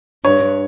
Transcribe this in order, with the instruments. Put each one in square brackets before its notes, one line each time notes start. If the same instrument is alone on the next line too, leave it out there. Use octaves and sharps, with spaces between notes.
[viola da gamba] G2 [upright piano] C#5